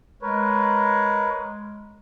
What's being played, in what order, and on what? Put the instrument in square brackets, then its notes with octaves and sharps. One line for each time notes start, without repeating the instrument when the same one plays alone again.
[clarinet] G#3 [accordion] A#4 B4 C#5